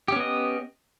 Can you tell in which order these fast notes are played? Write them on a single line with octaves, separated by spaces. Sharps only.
G4 C#4 B3 D#5